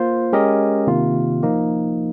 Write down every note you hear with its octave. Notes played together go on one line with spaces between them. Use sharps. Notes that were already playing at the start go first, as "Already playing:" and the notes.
Already playing: A#3 F4 C5
G#3 C#4 G4 A#4 D#5
C3 D#3 A#3 F4
F3 A#3 D#4